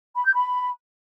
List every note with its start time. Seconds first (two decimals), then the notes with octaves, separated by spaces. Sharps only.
0.16 B5
0.25 G6
0.34 B5